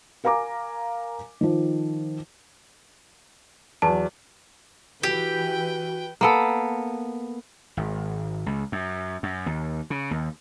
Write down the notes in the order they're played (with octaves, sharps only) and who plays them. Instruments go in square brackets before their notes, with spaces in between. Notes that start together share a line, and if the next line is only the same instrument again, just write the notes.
[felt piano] A#4 F5 G#5 A#5 D6
D#3 F3
[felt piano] E2 F#3 [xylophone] A5
[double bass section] E3 [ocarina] F#4 [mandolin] G4 [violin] B4 G5
[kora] A#3 B3 A4
[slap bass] G#1
C#2
F#2
F#2
D#2
C#3
D#2